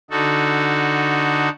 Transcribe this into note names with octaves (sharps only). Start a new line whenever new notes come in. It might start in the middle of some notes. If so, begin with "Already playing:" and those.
D3 D#4 F#4 A4